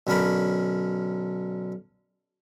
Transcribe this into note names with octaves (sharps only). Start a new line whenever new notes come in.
B1 D3 C#4 A#4 B5